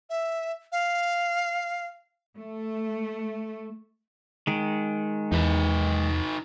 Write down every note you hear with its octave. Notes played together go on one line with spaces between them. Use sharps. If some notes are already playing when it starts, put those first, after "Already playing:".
E5
F5
A3
D#3 G#3
E2 D#4 B4